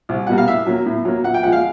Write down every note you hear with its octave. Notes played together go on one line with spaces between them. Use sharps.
C2
B2 G3 A#3 F#5
F5
A2 E5
F#3 A#3
A2
F#3 A#3
A#2 F#5
G5
F3 G#3 F#5
F5